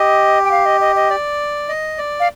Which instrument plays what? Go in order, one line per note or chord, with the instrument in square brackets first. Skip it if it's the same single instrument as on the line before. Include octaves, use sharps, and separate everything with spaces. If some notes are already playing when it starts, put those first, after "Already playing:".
Already playing: [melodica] G4 [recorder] D#5
[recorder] G5
F5
D#5
D#5
D#5
[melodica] D5
D#5
D5
[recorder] F5